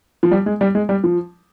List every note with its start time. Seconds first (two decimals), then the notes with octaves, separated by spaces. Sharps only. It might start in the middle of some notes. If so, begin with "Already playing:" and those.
0.23 F3
0.31 G3
0.46 G#3
0.61 G3
0.75 G#3
0.89 G3
1.04 F3